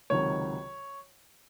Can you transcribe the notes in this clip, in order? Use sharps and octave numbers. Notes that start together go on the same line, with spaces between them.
C#2 C3 D#3 F#3 C#5